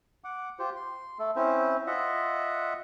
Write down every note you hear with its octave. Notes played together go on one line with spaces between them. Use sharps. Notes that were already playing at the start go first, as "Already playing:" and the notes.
F#5 D6
F4 G4 C5
C6
A3 A4
C4 C#4 E4 C5
F4 D#5 E5 F#5